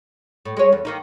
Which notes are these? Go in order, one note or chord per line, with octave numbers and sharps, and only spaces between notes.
A2
G#3 C#5
E2
D#3 A#3 D#4